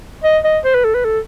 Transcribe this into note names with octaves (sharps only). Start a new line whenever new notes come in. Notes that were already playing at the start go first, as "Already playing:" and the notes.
D#5
D#5
C5
B4
A4
B4
A4